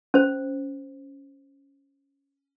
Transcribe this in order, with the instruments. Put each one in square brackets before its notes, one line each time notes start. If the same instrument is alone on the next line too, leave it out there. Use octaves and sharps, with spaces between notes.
[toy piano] C#4 C5